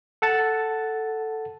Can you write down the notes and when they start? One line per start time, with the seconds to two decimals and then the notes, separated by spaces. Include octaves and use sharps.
0.22 A4 F#5 A5 A6